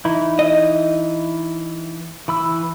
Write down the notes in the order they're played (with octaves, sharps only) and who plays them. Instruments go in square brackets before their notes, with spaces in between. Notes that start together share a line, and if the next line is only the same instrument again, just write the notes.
[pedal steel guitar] E3 D#4 E4
[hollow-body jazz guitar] D#5
[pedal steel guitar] E3 B5 E6